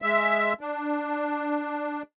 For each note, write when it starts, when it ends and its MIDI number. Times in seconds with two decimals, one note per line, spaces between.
0.02 0.53 56
0.02 0.53 76
0.61 2.02 62